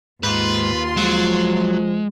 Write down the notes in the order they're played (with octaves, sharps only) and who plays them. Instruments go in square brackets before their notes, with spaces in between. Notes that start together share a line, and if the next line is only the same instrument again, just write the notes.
[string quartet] D#2 F4 C6 [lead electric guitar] G#2 [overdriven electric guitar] B4
[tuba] F3 [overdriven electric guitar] F#3 [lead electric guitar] G#3